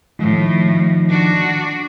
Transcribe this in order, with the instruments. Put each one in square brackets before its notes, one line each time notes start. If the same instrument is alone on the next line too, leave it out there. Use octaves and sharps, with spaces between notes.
[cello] A2 [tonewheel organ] D#3 F3
[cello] D4 F#4